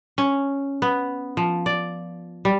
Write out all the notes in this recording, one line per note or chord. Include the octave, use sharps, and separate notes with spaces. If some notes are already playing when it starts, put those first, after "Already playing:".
C#4
B3
F3
D5
G3